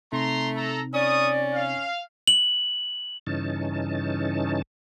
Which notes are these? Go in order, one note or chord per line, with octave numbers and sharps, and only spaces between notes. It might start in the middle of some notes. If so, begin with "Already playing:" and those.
C3 A3 C4 D#4 A#5 C6
A4 A#5
C#4 A#4 D5 C#6 D#6
F5
F#7
G2 C#3 E3 C#4 D#4 A5